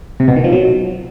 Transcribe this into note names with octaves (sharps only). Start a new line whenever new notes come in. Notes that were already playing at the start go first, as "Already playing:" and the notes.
C3
B2
D#3
F3
F#3